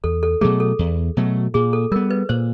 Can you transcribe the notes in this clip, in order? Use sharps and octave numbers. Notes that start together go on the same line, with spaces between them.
E2 A4
A4
B2 F#3 A3 G#4
A4
E2
B2 F#3 A3
A#2 G#4
A4
G3 B3 A#4
B4
A#2 C5